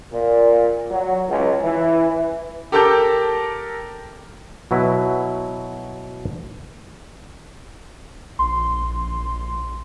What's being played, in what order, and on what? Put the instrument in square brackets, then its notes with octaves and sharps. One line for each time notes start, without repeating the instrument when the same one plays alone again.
[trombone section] A#2
F#3
C#2
E3
[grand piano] G4 A4 A#4 A5 D6 G6
[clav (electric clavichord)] B2 F#3 E4 B4
[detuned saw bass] A#1 [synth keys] C6